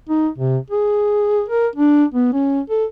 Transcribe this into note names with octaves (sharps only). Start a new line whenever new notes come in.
D#4
C3
G#4
A#4
D4
B3
C#4
A4